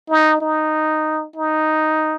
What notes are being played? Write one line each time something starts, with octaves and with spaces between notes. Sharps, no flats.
D#4
D#4
D#4